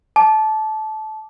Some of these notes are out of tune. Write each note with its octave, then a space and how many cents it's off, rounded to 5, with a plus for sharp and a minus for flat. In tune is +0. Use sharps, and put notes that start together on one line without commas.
A5 -20 D6 +0